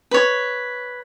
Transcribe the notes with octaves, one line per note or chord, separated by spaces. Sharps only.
B4 C#5